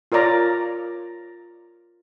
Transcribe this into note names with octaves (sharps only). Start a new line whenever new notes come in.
F4 A#4 C#5 D5 A#5